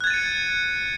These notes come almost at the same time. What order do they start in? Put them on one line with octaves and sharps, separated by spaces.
F#6 G#6 A6 D#7 C#7